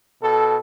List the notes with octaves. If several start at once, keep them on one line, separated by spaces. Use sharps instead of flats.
B2 A4